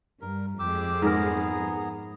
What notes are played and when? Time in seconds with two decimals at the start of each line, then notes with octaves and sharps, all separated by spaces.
0.21 G2 A#4
0.59 F2 G#3 G4 D6 E6
1.02 G#2 B3 G#4 A#4 A#5